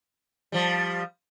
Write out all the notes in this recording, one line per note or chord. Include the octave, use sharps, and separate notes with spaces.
F3 G3